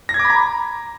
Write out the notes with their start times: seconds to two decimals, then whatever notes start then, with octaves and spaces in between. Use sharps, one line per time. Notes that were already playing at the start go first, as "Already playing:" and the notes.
0.09 A#6
0.14 G#6
0.19 D6
0.25 B5
0.30 A#5